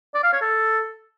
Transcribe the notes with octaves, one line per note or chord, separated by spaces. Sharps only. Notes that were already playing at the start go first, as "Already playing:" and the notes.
D5
F5
C#5
A4